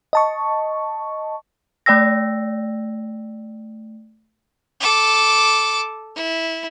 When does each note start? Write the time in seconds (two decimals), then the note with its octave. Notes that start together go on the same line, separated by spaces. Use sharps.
0.13 D#5 A5 C#6
1.86 A3 D5 G5 E6 A#6
4.80 A4 D6
6.16 E4